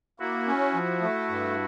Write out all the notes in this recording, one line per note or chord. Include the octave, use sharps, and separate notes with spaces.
A#3 E4 F#4
C#4
F3
A3
G2